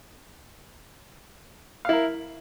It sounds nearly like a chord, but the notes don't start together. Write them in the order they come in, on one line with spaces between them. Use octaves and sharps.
F5 E4 A#4